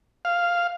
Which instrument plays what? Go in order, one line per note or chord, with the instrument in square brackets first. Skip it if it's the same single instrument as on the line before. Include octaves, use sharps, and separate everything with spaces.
[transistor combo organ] F5